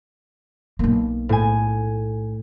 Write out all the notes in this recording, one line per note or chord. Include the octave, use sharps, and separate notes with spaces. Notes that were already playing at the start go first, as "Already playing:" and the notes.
B1 A#3
A2 G#5